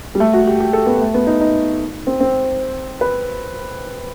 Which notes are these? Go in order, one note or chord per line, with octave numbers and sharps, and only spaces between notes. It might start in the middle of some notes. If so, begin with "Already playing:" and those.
G3
A3
F#4
G4
G4
A4
B3
A3
B3
D#4
D#4
C4
C4
B4